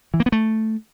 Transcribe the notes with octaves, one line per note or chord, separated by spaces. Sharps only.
E3
A#3
B3
A3